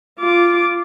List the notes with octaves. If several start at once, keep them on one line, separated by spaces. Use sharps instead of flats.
F4 D6